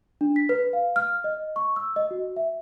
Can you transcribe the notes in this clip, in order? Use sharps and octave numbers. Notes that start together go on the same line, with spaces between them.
D4
B6
B4
F5
F6
D#5
C#6
E6
D#5
F#4
E5